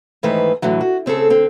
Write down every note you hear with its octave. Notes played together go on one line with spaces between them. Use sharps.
G#2 D#3 E3 A3 B4 C5
A2 D3 E3 F#3
F#4
C#3 C4 G#4 A4
D3 C4